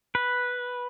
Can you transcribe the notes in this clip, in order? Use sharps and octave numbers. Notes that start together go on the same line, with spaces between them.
B4